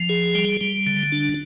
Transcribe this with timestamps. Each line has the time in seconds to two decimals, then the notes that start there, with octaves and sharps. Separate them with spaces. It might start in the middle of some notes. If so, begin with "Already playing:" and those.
Already playing: F3
0.09 G#4
0.35 G3
0.61 G3
0.87 D3
1.12 D4